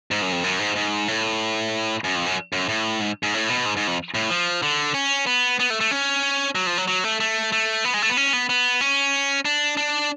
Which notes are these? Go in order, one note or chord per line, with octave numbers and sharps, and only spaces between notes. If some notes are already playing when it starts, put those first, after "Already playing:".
G#2
F#2
F2
F#2
G#2
G#2
A2
F#2
F2
F#2
F#2
A2
G#2
G#2
A2
B2
G#2
G#2
F2
A2
F3
D3
C#4
B3
B3
A3
A3
C#4
F#3
F3
F#3
F#3
A3
A3
A3
B3
G#3
A3
B3
C#4
B3
B3
C#4
D4
D4